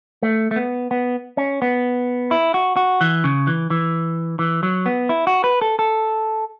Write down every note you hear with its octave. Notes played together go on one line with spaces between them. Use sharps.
A3
A3
B3
B3
C#4
B3
E4
F#4
F#4
E3
C#3
E3
E3
E3
F#3
B3
E4
F#4
B4
A4
A4